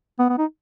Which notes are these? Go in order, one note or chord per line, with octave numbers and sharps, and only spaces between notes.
B3
B3
D#4